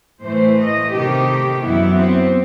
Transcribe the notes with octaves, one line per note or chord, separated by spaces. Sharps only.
A2 E3 A3 C5
D#5
C3 D#3 A3 G4
F#2 E3 B3 E4
C4